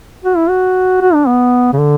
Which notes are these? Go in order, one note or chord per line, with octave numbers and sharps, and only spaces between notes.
F#4
E4
F#4
F#4
D4
B3
C#3
D3